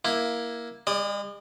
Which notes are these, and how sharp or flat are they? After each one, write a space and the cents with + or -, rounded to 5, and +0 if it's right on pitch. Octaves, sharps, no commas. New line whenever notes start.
A#3 +15 E4 +5
G#3 -40 D5 +0 D#6 +0